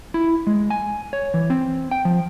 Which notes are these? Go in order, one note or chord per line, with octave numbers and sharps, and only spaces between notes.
E4
G#3
G#5
C#5
E3
C4
G5
F3